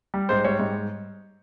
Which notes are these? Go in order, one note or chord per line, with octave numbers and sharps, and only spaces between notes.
G3
G#2 C5
G3 C#5
G#2